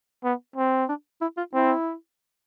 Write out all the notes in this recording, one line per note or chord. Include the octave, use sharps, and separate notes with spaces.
B3
C4
D4
E4
F4
C4 E4